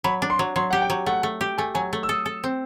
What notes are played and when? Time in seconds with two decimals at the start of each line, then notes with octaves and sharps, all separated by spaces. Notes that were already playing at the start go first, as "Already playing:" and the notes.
0.04 F#3 B5
0.22 D4
0.30 C6
0.39 F#3
0.56 F#3 C6
0.71 G4 F#5
0.82 G5
0.90 F#3
1.06 A3 F#5
1.23 A3
1.41 G4
1.58 A3 G#5
1.75 F#3 G#5
1.93 A3
2.03 E6
2.09 A4 D#6
2.26 A4
2.44 C4